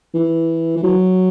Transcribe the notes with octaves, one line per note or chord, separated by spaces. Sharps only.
E3
E3
F#3